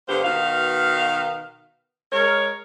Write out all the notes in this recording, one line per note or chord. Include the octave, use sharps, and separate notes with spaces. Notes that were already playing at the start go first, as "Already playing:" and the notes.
G2 D3 A#3 B3 G4 C5
B2 D#3 F#4 B4 F5
G#3 A#4 C#5